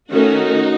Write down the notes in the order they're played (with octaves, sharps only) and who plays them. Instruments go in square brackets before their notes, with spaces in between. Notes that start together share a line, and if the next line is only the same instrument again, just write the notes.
[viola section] D#3 A3 C#4 D#4 F#4